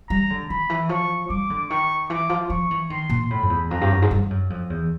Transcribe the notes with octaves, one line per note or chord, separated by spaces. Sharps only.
G3 A#5
D3
D#3 B5
E3
F3 C#6
G3 D6
D3
D#3 C#6
E3 D6
F3
F3 C#6
E3
D#3 C6
A#2
A2 B5
F2
E2
F2 A#5
G2
F#2
G#2
G2
F#2
F2
E2